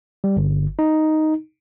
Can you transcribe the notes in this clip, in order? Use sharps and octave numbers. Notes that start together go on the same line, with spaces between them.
G3
G1
D#4